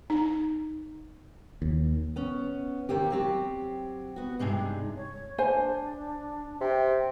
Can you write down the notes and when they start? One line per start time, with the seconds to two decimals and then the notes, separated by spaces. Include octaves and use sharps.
0.10 D#4
1.62 D#2
2.16 B3 C#4
2.89 D#3 A#3 C4 G4
3.10 F#3 C4 G4
4.16 B3 F#4
4.39 G2 C3 G#3 D4 D#4
4.96 C#5
5.38 D4 C5 G#5
6.61 C3 G5